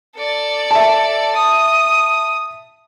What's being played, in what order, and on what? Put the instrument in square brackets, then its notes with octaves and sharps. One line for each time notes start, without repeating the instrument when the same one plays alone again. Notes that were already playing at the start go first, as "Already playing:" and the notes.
[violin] A4 D5
[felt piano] E5 A5
[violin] D#6